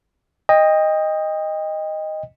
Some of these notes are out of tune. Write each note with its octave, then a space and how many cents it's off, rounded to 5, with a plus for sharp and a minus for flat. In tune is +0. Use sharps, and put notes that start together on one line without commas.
D#5 +0 G5 +30